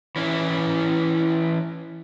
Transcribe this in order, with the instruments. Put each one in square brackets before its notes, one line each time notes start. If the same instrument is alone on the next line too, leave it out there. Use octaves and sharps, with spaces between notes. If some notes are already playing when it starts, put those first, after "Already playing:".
[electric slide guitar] E3 C#4 E4